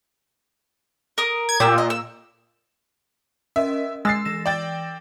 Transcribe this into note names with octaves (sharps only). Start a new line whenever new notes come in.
A#4 D#6
G#6
A#2 G4 E6
D#5
E6
C#4 A#4 D#5 E5
G#3 E6 A6 C7
E3 A#6 E7
D5 G5 A6